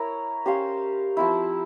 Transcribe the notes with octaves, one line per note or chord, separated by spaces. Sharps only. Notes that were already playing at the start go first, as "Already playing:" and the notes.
Already playing: E4 A#4 C#5
C#4 G4 C5 F5
F3 C4 E4